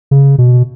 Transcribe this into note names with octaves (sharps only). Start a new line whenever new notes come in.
C#3
B2